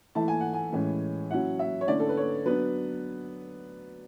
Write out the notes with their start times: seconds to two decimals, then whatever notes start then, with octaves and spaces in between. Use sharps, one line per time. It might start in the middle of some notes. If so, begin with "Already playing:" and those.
0.15 E3 A3 E4 A5
0.28 G#5
0.40 F#5
0.53 G#5
0.72 A2 E3 G#3 C#4
1.31 F#3 C#4 E4 F#5
1.59 E5
1.81 C#5
1.88 D3 A3 C#4 E4 D5
2.00 A4
2.09 B4
2.17 C#5
2.46 F#3 B3 D4 B4